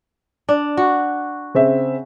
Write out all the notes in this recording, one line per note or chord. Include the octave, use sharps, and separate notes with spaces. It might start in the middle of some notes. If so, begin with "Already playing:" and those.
D4
F#4
C#3 C4 E5